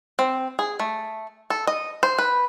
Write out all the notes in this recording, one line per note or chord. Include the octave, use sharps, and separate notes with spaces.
C4
G#4
A3
A4
D#5
C5
B4